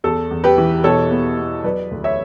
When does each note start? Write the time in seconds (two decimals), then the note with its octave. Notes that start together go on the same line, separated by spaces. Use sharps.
0.04 E2 A4
0.31 E2
0.44 G4 B4
0.58 E3
0.84 B2 A4 C#5
1.11 B3
1.38 B3
1.64 F#3 B4 D5
1.91 D2
2.04 C#5 E5